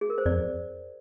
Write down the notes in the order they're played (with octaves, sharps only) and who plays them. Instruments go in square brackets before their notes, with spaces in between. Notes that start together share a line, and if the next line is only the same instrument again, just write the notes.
[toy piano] G#4
A#4
C5
[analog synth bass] F2 [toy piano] D5